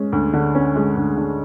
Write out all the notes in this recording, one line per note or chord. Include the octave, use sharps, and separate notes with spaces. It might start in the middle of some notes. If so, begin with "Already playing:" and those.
Already playing: G#3 C#4
D2
D3
C#4
G#3
D2
D3